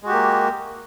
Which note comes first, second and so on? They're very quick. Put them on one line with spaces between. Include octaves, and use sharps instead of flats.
G#3 F#4 G4 A#3